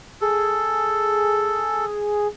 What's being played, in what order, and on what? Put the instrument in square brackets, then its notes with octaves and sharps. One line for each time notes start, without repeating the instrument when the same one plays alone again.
[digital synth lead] G#4 [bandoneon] A4